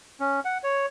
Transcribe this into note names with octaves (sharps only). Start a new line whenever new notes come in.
C#4
F#5
C#5